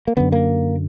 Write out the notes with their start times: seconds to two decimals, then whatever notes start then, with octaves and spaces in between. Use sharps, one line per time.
0.07 A#3
0.17 F#2 D3 B3
0.32 A#3